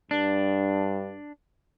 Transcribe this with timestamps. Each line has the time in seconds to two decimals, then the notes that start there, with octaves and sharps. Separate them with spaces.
0.11 G2 D4